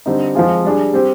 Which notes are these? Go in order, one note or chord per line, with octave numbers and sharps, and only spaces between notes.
D3 G3 C4 D#4
F3 G#3 C4 F4 G#4
G3 D4 G#4
G3 C4 G4